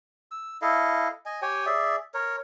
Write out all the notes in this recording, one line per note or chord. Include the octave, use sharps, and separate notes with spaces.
E6
E4 A4 D#5 F5
D#5 G#5
G4 C#5 G5 G#5
G#4 D5 E5
A#4 C#5